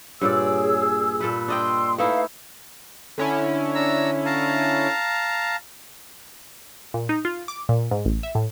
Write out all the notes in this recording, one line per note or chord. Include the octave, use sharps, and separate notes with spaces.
G2 A#2 G#4 C#5 D5 E6
A#2 A4 B4 B5
D4 D#5 G5 C6 E6
A3 D#4 E4 B4 F5
D3 C#4 E4
D4 A#5 E6
F5 A5 A#5
A#2
D#4
F4
D6
A#2
G#2
A1
E5
A2